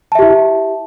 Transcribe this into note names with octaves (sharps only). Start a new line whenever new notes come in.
E4 G4 E5 A5